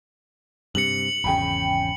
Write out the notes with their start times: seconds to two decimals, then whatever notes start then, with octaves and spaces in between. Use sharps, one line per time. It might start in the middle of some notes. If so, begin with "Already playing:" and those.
0.75 G2 C3 C#7 F#7
1.24 G#1 E2 C#3 G5 G#5 B5